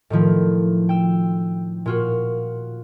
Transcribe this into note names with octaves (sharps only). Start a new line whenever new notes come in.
A2 D#3 F3 A3
G5 E6
A#2 F4 F#4